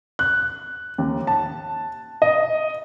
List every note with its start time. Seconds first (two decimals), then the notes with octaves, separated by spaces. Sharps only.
0.19 F#6
0.98 D#2
1.27 A5
2.22 D#5